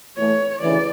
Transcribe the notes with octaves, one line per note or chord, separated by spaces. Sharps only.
A2 E3 A3 C#5
D2 C#3 E3 D5